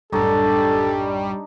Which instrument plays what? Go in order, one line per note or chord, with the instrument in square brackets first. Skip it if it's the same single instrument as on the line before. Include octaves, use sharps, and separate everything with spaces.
[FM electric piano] A#1 F#2 A2 [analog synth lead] G3 [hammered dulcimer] D4 D#4 C#5 [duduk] A4